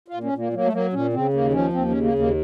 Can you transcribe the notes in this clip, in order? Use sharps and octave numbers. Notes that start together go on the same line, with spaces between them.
F4
A#2
C#4
A#2
A#3
F#3 A#3
A3
F#3 A#3
A#2 C#4
C#3 C4
D#2 A#3
F3 C#4
D#2 C4
C#3 C#4
A#3
D#2
A#3